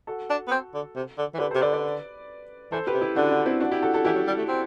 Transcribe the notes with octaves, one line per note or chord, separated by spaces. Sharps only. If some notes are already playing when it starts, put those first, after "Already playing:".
F#4 A4
D4
B3
C4
D3
C3
D3
E3
D3 G4 B4
A4 C5
C3
D3 B4 D5
B4 D5
E3 A4 C5
G4 B4
C3
E4 G4
D3 D4 F#4
D4
C4 E4
D4 F#4
E4 G4
F#4 A4
F#4 A4
E3 E4 G4
F#3
G3
A3
C4